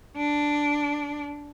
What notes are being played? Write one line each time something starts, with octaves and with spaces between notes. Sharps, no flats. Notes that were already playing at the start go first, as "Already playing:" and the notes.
D4